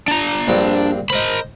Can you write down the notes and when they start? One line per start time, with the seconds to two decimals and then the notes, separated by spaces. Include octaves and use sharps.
0.08 D4 A#5
0.47 A#1 G2 C4
1.10 A#4 C5 D#5 B5